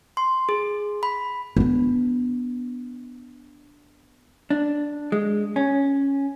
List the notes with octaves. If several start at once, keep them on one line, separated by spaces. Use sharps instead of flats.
C6
G#4
B5
B3 D4
D4
G#3
C#4